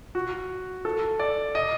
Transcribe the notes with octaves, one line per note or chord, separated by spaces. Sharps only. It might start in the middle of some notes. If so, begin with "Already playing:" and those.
F#4
A4
D5
D#5